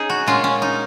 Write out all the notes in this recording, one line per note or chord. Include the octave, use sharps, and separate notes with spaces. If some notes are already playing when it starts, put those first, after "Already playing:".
Already playing: C#4 D#4 G#4
F#4
A#2 G#3 C#4 F4
C#4
D#4